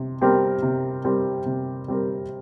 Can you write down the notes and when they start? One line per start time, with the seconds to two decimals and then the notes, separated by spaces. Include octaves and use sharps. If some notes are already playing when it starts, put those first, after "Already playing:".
Already playing: C3
0.21 G3 C4 G4 A#4
0.63 C3
1.05 G3 C4 G4 A#4
1.46 C3
1.88 G3 C4 G4 A#4